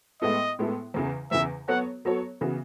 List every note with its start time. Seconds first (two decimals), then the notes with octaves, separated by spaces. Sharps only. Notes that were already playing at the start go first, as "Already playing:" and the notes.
0.22 A2 G#3 B3 E4 A4 D#5
0.59 A2 G#3 B3 E4 A4
0.94 E2 C#3 E3
1.31 E2 C#3 E3 E5
1.68 F#3 B3 F#4 A4 C#5 F#5
2.05 F#3 B3 F#4 A4 C#5
2.41 C#3 E3 B3 F#4